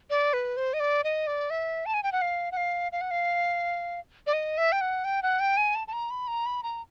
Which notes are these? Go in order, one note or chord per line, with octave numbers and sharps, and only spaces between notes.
D5
B4
C5
D#5
D5
D#5
D5
E5
A5
G#5
G5
F#5
F5
F#5
F5
F5
F#5
F5
D5
D#5
E5
G5
F#5
G5
F#5
G5
G#5
A5
A5
A#5
B5
A#5
B5
A#5